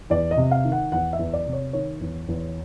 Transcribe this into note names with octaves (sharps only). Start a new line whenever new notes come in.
E2 D5
D#5
C3
F5
D#3
F#5
E2 F#5
E5
E2
D5
C3
C#5
D#3 C#5
E2
E2